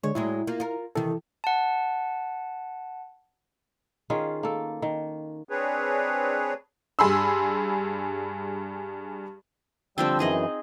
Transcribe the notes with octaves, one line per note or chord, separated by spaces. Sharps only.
D3 G#3 C#5
A2 F#3 G#3 E4
A#3 F4
F4 A#4
C3 D#3 E3 E4 A4
F#5 A5
D#3 C#4 F4 G#4
A#3 A4
D#3
C4 D4 G#4 B4 C#5
G2 G#4 B5 C6 E6
D3 F3 G3 C4 G5 E6
F#2 E3 D#4 G#4 D#5